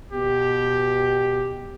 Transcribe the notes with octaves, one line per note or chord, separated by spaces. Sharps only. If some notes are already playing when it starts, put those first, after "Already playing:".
B2 G4